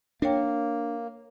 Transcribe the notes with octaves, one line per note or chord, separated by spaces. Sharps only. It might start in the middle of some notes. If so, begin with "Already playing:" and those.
A#3 D4 A#4 C#5 G5